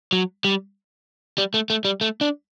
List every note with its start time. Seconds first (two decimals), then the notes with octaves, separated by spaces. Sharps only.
0.13 F#3
0.44 G3
1.38 G3
1.54 A3
1.70 A3
1.85 G3
2.01 A3
2.21 D4